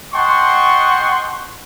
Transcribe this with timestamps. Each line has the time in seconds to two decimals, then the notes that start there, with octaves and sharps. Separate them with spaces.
0.14 D#5 F#5 G5 A5 C6 C#6